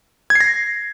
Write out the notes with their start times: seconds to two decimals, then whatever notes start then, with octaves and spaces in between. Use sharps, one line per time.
0.30 G#6
0.35 C7
0.41 A#6